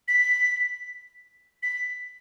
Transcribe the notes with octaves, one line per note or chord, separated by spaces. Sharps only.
B6
B6